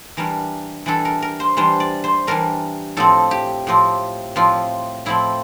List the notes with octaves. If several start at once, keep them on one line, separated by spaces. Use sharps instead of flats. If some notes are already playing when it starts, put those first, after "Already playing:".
E3 G3 D4 A#4
E3 G3 D4 A4
A#4
A#4
C5
E3 G3 D4 C5
D5
C5
E3 G3 D4 A#4
A2 F3 C4 A4
G4
A2 F3 C4
A2 F3 C4 F4
A2 F3 C4 E4